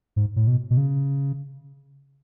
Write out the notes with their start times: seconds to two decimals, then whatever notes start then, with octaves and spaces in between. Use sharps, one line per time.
0.16 G#2
0.36 A2
0.47 B2
0.71 B2
0.77 C#3